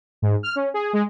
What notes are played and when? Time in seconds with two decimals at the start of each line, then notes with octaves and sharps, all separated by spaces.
0.22 G#2
0.43 F6
0.55 C#4
0.74 G#4
0.93 G#3